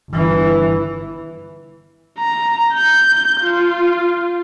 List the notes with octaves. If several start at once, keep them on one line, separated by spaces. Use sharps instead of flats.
G1 E3
A#5
G6
F4